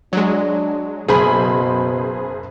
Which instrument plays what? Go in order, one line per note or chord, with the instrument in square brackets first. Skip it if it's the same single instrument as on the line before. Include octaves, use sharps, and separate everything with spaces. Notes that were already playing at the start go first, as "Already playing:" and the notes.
[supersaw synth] F#3 G#3 [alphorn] D4
[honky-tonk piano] F#1 C5 B5 [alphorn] B2 [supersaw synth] G#4